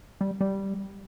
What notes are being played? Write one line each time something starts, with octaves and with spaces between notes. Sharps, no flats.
G3
G3